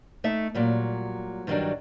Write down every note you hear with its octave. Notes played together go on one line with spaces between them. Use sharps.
A3 D#4 E5
A#2 F#3 G3
G2 D#3 F#3 G3 D4